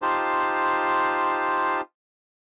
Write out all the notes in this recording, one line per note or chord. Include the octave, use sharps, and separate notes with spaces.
D#4 F4 G4 C5 A5